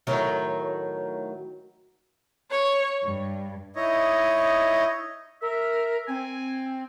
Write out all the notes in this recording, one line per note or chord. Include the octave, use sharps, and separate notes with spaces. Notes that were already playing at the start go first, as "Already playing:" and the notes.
A2 D#3 F#3
C#5
G2
D#4 E4 C#5 D#5
A#4 E5
C4 G#5